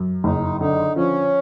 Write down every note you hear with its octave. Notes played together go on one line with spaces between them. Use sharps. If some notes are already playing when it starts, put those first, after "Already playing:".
Already playing: F#2
F#1 D#4
D3 D#4
F3 C#4